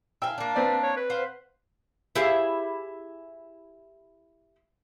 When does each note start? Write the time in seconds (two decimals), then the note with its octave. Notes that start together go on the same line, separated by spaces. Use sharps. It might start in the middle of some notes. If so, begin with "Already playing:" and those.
0.22 E5 F5 G5 G#5 E6
0.38 A#3 D4
0.56 C4 B4 D5
0.83 C#5
0.96 B4
1.10 C5 F5 F#5
2.15 E4 G4 G#4